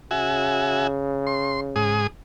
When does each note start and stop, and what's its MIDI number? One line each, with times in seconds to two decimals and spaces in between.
0.11 2.04 49
0.11 0.87 66
0.11 0.87 76
0.11 0.87 80
1.27 1.60 84
1.76 2.07 44
1.76 2.07 68
1.76 2.07 87